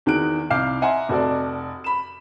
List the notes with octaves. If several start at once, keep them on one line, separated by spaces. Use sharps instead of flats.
E2 D#3 F#4 G#4 F#6 D7
C2 F5 D6 F6 G6 C7
D#5 E5 F#5 G#5 A#5 C6
F1 F#4 A4 D5
B5 E7